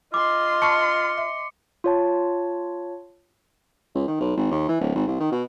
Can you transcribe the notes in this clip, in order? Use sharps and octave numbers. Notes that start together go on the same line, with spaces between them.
F4 D#5 C6 D6
A5 C#6 F6 C#7
E5
F4 C#5 A5
C#2
D#3
B1
G#1
D#2
E3
D1
G#1
C2
D#3
B2